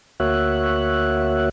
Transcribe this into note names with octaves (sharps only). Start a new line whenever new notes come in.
D2 A#3 F#4 C#5 E5 F#6